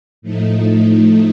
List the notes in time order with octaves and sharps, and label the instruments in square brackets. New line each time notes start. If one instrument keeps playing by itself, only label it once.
[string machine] A2 F3 A3 D#4